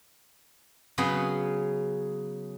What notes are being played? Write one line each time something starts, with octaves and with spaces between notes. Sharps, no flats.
C#3 F#3 B3 C#4 G#4 B4